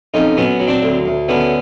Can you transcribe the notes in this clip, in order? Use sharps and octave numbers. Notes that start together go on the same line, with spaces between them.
F2 C#4 D#4
F#3 B3 C#4
F#3
C4 D4
D2
D2
D3 B3 C#4